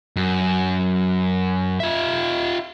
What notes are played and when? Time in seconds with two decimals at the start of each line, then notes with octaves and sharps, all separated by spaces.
0.16 F#2
1.80 F4 E5